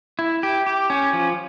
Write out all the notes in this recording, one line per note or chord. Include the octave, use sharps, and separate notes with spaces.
E4
G4
G4
C#4
F3